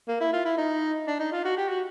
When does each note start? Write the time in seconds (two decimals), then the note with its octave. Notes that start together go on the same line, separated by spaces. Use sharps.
0.08 A#3
0.20 E4
0.33 F4
0.45 E4
0.58 D#4
1.07 D4
1.20 D#4
1.32 F4
1.45 F#4
1.57 G4
1.69 F#4